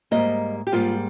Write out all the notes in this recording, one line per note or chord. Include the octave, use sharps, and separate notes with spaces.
G#2 G3 A#3 D#5
G4
G#2 G3 A#3 F4